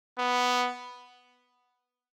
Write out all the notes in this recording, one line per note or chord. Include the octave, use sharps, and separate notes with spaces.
B3